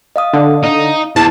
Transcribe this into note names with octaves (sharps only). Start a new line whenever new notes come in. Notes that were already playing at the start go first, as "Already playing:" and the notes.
D#5 F5 D#6
D3
D#4
E2 E4 A5